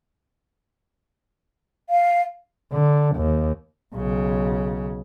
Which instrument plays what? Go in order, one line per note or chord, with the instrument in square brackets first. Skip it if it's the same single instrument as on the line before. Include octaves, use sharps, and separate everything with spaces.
[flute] F5
[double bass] D3
D#2
B1 C#3